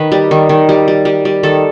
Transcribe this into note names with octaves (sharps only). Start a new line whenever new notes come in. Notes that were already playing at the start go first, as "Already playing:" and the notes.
Already playing: D#3 B4
G3
D#3
D#3
G3
G3
G3
G3
D#3 A4